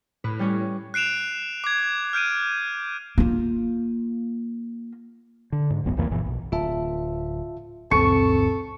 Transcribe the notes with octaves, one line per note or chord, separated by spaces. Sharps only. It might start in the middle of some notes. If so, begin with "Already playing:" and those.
A2 B4
G3 C#4 C#5
F#6 C7 D7 E7 F7
D6 G#6
F6 G6 D7 D#7
A#3 F4
D3
G#2
D1 A1 F#2 B3
C2 F2 E3 A#3
F1 F#2 A#2 E3
B1
D1 F4 E5 A5
D#1 C#2 F#2 C4 A4 C#6